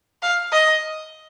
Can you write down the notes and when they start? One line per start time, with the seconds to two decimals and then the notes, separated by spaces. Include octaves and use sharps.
0.22 F5
0.52 D#5